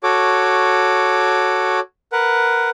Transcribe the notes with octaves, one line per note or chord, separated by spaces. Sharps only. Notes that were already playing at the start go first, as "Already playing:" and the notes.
F#4 A4 C#5 D6
A#4 B4 F#5